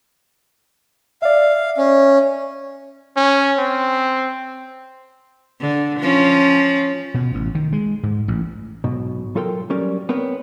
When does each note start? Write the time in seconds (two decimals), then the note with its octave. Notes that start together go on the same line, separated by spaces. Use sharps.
1.22 D5 E5 F5
1.77 C#4
3.16 C#4
3.58 C4
5.61 D3
6.00 F3 C#4
7.14 B2
7.35 A1
7.55 D#3
7.73 G#3
8.03 G#2
8.28 A1
8.84 B1 G#2 B2
9.35 F#3 F4 A4 A#4 G5 C6
9.70 F#3 G3 C#4 A#4 D5
10.09 B3 C4 A#4 C#5